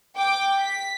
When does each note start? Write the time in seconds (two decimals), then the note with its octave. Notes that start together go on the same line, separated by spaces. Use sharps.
0.16 G5 D6
0.60 B6